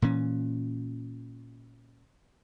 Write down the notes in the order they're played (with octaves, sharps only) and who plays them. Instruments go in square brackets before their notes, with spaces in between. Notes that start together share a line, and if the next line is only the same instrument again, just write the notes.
[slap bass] A#2 E3 C#4